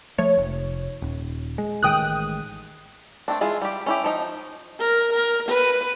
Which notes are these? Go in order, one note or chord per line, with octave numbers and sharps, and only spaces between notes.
F3 A3 C#5
F1
D#1
G#3
A1 D#3 G#3 G5 D#6 F#6
A3 C4 D4
E3 G#3 E4 F4 G#4
G3 G4
C#4 E4 G4
F3 D#4
A#4
A#4
B4